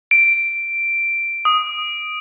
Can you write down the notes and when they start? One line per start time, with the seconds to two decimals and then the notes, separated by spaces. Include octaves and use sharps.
0.11 D7
1.45 D#6